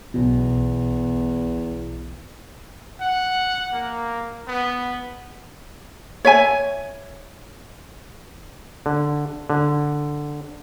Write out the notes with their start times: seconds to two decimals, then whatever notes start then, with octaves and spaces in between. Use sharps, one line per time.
0.14 B1 E2 B2
3.01 F#5
3.74 A#3
4.49 B3
6.25 C#5 E5 G#5
8.86 D3
9.50 D3